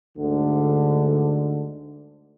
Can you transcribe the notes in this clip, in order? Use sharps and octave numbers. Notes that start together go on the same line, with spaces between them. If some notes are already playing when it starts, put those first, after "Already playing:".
D2 G#2 D3